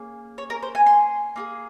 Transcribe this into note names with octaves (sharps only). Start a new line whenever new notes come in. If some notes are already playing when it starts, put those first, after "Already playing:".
Already playing: A#3 C#4 G#4
C#5
A#4
C5
G#5
C6
A#3 F4 G#4